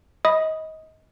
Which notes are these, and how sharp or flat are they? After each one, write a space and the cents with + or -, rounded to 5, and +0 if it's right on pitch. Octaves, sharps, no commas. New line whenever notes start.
D#5 +25 B5 +0 D#6 +0